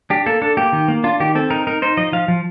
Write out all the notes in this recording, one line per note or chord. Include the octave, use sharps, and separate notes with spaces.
D4 G4
A#3 A4
D4 A4
A#3 G4
D#3
A#3
D4 F4
D#3 G4
C4 A4
D#4 A#4
D#4 A#4
D#4 C5
F3 D#5
F3 F5
F3